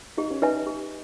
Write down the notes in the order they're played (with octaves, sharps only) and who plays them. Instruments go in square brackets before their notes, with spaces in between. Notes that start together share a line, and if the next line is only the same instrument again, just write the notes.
[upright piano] D#4 [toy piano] G4
[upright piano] C#4
[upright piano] D#4 [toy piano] B4 E5 G#5
[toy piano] G4